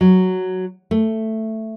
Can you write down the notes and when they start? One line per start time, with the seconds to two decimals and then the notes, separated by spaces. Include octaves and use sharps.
0.01 F#3
0.91 A3